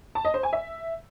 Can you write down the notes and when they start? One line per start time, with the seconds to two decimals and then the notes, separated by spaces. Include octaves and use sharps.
0.15 A5
0.25 D#5
0.34 C5
0.43 G#5
0.53 E5